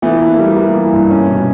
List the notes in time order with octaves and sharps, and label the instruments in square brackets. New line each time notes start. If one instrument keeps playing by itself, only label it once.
[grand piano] E3 [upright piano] A3 B3
[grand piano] A#3
G3
A#3
E3
G2
C#4
B2